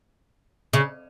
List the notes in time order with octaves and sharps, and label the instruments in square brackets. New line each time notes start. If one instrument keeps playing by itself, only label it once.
[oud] C#3